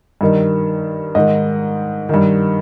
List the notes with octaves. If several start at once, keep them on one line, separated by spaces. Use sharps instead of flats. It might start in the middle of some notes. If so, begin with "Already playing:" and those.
G2 D#3
G#2 D#3 D#5
G2 D#3